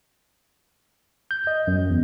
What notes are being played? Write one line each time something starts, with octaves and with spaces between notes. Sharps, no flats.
G6
D#5
F#2
E2